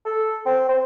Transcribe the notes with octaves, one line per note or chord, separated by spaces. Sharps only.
A4
C4
C5